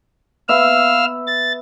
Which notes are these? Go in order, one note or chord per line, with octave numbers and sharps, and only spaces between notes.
B3 E5 F5 E6 F6
A6